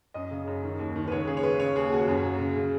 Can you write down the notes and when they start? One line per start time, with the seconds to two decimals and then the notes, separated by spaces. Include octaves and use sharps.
0.14 F#2 D#5
0.31 C#3
0.47 F#2
0.64 D#3
0.79 D#2
0.96 D#3
1.07 B4
1.11 C#2 C#5
1.27 C#3 G#4
1.37 C#5
1.43 C#3 B4
1.60 C#3 C#5
1.76 D#2 G#4
1.92 D#2 F#4
2.08 F#2
2.24 C#3
2.40 C#3
2.56 C#3